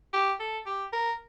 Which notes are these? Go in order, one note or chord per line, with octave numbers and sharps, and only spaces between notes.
G4
A4
G4
A#4